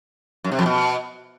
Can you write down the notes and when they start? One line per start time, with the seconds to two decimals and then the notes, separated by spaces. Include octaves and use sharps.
0.44 F#2
0.52 C3
0.59 F2
0.66 B2